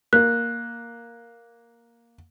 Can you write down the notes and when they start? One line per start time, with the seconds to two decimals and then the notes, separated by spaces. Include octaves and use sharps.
0.13 A#3 F#6